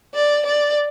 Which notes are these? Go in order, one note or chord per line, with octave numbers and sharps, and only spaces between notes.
D5
D5